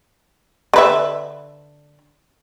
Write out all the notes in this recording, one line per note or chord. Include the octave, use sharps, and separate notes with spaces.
D3 B4 E5